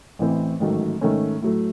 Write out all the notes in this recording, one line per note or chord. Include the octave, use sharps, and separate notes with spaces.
A1 A2 E3 C4
A1 G#2 D#3 F#3 A3
G#2 D#3 A3 C#4
A2 F#3 A3